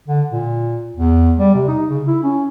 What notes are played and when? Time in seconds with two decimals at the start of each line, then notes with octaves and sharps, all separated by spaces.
0.08 D3
0.31 A#2
0.97 E2
1.39 G3
1.54 C3
1.68 D#4
1.90 C#3
2.07 E4
2.23 C#4